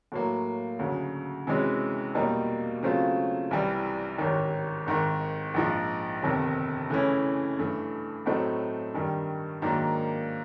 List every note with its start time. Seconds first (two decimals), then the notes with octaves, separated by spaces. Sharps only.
0.12 A2 F#3 A#3
0.79 D2 C#3 F#3
1.47 C3 E3 G#3 C#4 F#4
2.15 E2 B2 G3 A#3 D#4
2.83 C#3 F#3 A3 C4 F4
3.51 C2 C3 E3 G3
4.18 A1 G#2 D#3
4.86 G#1 G#2 D#3
5.54 A#1 G#2 F3
6.22 G1 F2 C3 D#3
6.90 C#3 E3 A3 C#4 E4
7.58 G2 E3 A3
8.26 A2 F#3 A3 C4 D#4
8.94 G2 D#3 G3
9.62 G#2 D#3 F#3 A#3 D4